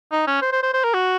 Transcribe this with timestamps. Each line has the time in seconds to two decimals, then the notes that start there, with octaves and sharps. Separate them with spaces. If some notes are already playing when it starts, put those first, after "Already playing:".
0.12 D#4
0.27 C#4
0.42 C5
0.52 C5
0.63 C5
0.74 C5
0.84 A#4
0.94 F#4